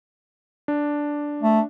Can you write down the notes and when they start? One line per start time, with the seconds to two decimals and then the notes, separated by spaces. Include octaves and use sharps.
0.68 D4
1.43 A3